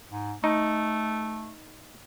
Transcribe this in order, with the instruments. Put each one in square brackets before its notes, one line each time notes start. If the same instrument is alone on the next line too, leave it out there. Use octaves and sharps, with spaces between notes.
[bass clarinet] G#2
[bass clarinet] A3 [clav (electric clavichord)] D#4